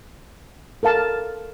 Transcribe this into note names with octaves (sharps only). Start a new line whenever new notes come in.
A4 A#4 F5 A5